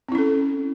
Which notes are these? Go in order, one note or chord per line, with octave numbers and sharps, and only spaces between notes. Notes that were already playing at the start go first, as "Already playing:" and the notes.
C4 C#4 E4 A4